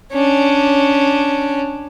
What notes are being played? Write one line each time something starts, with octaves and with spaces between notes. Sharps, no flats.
C#4 D4